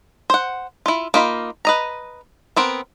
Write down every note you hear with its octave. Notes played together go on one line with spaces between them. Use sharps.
C5 F#5
E4 F4
A#3 D#4 F4 D#5 B5
B4 D#5 A#5
B3 C4 A#4